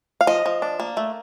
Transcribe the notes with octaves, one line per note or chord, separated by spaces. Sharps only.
F5
F3 D#5
F3
D4
A#3
A3